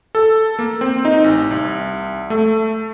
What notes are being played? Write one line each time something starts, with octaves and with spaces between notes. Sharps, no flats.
A4
A#3
C4
D#4
A1
C2
A3